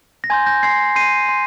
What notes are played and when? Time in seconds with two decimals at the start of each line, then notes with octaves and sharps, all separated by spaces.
0.24 A#6
0.30 G#5 C6 G6 G#6
0.46 G6 A#6
0.63 G#5 C6 G6 G#6 C7
0.96 C6 G6 C7 D#7
1.29 C6